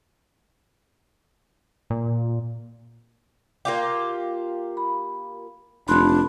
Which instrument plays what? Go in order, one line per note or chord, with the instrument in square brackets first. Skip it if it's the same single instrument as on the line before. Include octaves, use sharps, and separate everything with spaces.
[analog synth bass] A#2
[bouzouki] A#3 F4 G4
[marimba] B5
[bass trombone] F1 [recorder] D4 [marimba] B5 C6 F#6